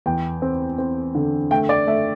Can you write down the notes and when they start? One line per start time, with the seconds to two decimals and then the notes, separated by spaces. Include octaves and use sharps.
0.06 E2 G5
0.42 C4
0.78 C4
1.15 D3
1.51 A3 G5
1.69 D5
1.87 A3 E5